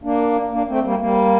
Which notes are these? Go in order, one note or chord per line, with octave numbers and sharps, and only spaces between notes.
A#3 D4
A#3 D4
A3 C4
G3 A#3
G3 A#3